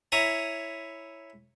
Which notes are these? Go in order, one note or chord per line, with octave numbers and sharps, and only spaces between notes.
E4 C#5 G#5 A#5